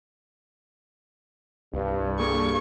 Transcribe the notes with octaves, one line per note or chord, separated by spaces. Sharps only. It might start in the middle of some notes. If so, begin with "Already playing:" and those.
C2 G2
A#3 G#4 A4 C#6